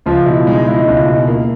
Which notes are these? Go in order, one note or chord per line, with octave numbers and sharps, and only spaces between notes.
C#2 F3 F4
B2 E4
G#3 D#4
G#3 E4
C#2
B2
A#3